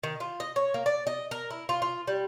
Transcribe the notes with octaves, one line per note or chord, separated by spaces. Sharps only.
D#3
F4
D#5
C#5
A#3
D5
D#5
A#4
E4
F4
F4
G3